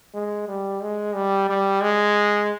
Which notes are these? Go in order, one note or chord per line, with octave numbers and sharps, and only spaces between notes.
G#3
G3
G#3
G3
G3
G#3